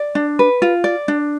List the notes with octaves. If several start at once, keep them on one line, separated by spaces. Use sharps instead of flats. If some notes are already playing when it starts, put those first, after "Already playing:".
Already playing: D5
D4
B4
F4
D5
D4